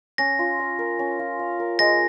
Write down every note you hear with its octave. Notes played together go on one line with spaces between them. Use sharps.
C#4 A#6
F4
F5
A#4
C#4
F4
F5
A#4
G#3 A#6